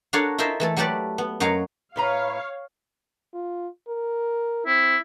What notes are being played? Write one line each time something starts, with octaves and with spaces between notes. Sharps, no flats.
D4 F#4 A4 A#4 C#5 F5
E4 F4 A#4 C5 D#5 E5
E3 A3 A4
F#3 A3 G4 A4 B4 D5
B3
F#2 F#3 C#5 D#5 F5 A#5
A2 B4 C#5 F5 A#5
F4
A#4
C4 E4